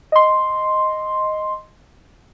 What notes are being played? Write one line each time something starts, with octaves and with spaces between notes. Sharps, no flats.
D#5 C6